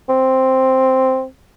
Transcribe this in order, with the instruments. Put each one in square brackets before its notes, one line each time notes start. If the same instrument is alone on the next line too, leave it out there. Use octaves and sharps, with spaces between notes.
[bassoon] C4